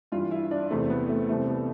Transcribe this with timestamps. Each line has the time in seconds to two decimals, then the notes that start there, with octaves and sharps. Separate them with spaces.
0.12 G2 E3 F4
0.31 E4
0.51 D4
0.70 E2 C3 E3 A3
0.90 B3
1.09 A3
1.29 C2 C3 E3 A3
1.48 B3